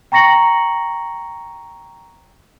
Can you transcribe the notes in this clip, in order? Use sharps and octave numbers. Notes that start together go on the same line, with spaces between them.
G5 A#5 C#6 A#6 C#7 F#7